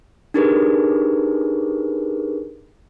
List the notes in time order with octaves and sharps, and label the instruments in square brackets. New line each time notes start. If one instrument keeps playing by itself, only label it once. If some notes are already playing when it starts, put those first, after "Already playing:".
[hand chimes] D4 D#4 G4 G#4 A#4 B4